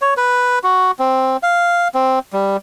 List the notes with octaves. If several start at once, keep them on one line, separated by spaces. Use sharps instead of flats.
C#5
B4
F#4
C4
F5
C4
G3